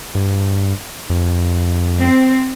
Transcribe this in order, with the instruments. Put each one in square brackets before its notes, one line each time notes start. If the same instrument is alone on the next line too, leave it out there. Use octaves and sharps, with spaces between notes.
[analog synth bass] G2
F2
[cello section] C4